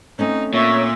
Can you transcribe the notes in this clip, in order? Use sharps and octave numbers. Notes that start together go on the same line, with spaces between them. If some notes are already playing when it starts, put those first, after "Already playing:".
A3 C4 C#4 D#4
A#2 C#5 E5